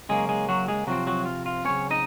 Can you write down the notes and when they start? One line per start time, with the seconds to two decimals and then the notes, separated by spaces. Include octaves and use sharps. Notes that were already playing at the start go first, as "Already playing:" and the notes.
0.09 C#3 F#3 G#3 A#3 C#4 G#4
0.29 G#3 G#4
0.49 F#3 F#4
0.68 G#3 G#4
0.87 C3 F3 F#3 C4 F#4
1.07 F#3 F#4
1.26 F4
1.46 F4
1.65 C#3 F#3 C4 C#4 C#5
1.91 D#4 D#5